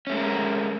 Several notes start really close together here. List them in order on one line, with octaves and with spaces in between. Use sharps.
C#4 A3 G#3 A4 A#4